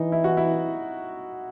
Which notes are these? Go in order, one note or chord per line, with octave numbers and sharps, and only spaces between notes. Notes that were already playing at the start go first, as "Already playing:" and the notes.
Already playing: E3 D#4
E4
F#4
E4